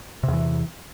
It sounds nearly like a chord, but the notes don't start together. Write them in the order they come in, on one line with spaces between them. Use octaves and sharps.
C3 E2 E3